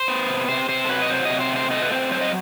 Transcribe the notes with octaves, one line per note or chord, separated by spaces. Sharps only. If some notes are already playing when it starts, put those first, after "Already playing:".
Already playing: C5
B3
C3
C3 C5
C3 C5
A4
F#3 B4
D#5
F#3 C5
C3 D#5
C5
A3 C5
A3 D#5
B4
C4 C5
F#3 C5
D#5